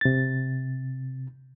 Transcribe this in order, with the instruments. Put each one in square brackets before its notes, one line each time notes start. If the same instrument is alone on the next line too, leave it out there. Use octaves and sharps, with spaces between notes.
[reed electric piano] C3 A6